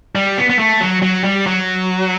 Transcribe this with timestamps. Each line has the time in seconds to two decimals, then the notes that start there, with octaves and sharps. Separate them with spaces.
0.15 G3
0.38 B3
0.49 B3
0.59 A3
0.80 F#3
1.02 F#3
1.24 G3
1.47 F#3